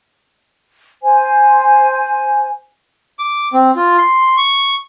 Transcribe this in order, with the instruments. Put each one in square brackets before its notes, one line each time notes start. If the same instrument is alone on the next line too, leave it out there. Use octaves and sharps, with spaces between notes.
[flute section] C5 G#5
[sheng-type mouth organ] D6
C4
F4
C6
C#6